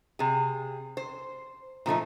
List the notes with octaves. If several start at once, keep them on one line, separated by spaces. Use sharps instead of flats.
C3 G#4
C5
A#2 F3 A3 D#4